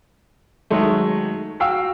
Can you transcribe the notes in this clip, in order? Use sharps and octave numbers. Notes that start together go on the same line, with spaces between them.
D#3 F#3 G#3 A3
F#4 F5 G5 E6